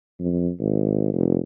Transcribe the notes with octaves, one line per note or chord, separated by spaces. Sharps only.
F2
G#1
F1